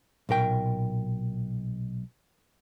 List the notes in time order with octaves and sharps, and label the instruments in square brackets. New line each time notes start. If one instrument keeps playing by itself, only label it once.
[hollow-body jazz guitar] B1 A#2 A#4 G5